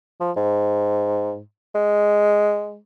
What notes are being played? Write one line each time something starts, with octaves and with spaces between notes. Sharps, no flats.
F3
G#2
G#3